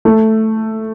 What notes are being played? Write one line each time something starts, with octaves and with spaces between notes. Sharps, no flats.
A3